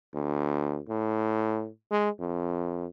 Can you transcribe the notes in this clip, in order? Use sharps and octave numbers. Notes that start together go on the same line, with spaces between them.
D2
A2
G#3
F2